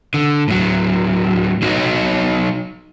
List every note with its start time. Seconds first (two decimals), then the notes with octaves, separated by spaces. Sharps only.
0.14 D3
0.48 A2 F#3
1.62 F#3 D#4 F#4 C#5 D#5